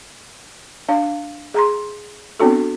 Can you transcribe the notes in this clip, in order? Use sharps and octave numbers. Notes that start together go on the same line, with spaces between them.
D4 F5
G#4 A#5 C6
B3 C4 D4 F#4 A4